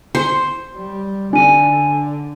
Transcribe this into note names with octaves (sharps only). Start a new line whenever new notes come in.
C5
G3
D3 D4 G#5 D#7